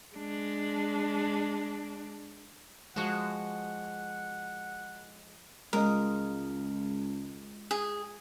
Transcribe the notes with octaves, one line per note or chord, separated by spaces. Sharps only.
G#3 D4
F3 G#3 F#4 F#5
C#2 G#3 F4 A#4 D#5
G#4